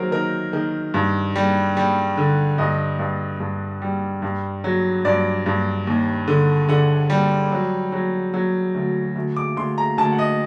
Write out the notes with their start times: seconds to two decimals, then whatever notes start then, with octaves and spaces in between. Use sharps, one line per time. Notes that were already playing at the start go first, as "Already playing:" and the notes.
Already playing: D#3 F#3 A#4 C5
0.11 D#3 A#4
0.53 D#3
0.94 G2
1.36 G3
1.77 G3
2.17 D3
2.58 G2 D#5
2.99 G2
3.40 G2
3.82 G3
4.22 G2
4.64 F#3
5.05 G2 D5
5.46 G2
5.87 D#2
6.28 D3
6.69 D3 F#5
7.10 G3
7.52 F#3
7.92 F#3
8.34 F#3
8.75 D2
9.16 D2
9.36 D6
9.56 D2 C6
9.78 A#5
9.98 D2 A5
10.12 F#5
10.18 D#5